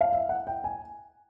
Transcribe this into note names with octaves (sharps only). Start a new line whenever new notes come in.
F5
E5
F#5
G5
G#5